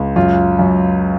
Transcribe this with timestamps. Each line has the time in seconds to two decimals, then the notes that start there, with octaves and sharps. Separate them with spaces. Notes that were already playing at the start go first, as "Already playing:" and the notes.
Already playing: C#2
0.16 F#2 F4
0.59 F#2